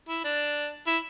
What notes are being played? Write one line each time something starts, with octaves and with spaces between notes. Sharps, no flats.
E4
D4
E4